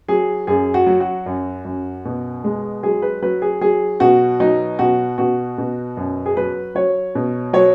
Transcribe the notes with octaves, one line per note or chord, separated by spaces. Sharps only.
F#3 G#4
F#2 G#4
F#4
F#3
F#4
F#2
F#2
B2
G#3
F#3 G#4
B4
F#3 B4
G#4
F#3 G#4
B2 F#4
F#3 D#4
B2 F#4
B2 F#4
B2
F#2
G#4
F#3 B4
F#3 C#5
B2
F#3 C#5